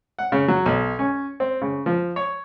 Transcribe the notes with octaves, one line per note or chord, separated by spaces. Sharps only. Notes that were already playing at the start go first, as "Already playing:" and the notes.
F#5
C#3
F#3
B1
C#4
C4
C#3
F3
C#5